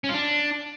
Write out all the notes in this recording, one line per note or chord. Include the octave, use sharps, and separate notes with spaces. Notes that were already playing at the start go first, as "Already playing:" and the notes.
C#4
F4
D4